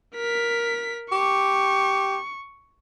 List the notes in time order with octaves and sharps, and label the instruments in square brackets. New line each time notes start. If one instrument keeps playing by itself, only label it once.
[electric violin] A#4 B6
[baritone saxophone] G4 [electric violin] C#6